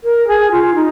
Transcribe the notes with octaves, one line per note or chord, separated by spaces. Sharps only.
A#4
G#4
F4
D#4